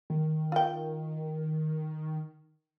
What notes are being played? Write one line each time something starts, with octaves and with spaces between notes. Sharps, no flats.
D#3
F4 G5